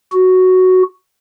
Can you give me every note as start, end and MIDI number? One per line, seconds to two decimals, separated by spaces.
0.12 0.83 66